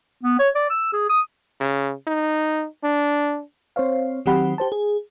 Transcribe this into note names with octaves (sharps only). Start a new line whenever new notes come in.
B3
C#5
D5
E6
G#4
D#6
C#3
D#4
D4
C4 C5 C#5 F5
D#3 F#3 C4 G4 F#5 B5
G4 C5 A5
G#4